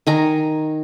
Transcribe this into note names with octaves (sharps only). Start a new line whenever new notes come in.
D#3 G#5 A#5